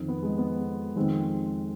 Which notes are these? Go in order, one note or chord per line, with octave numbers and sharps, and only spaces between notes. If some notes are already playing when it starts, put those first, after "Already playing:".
Already playing: F2 D#3
B3
G#3
B3
F2 D#3 G#3 C4